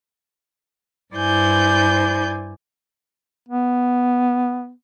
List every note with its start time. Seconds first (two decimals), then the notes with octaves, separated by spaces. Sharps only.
1.15 G2 E4 C5 D5 G#5 G6
3.49 B3